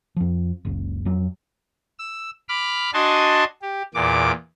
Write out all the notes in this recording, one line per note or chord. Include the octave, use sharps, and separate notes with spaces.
F2 F3
F#1 C#2
F2 F#3
E6
B5 D6 F6
D4 F#4 D#5 G#5 A5 C6
G4
E2 A#2 D6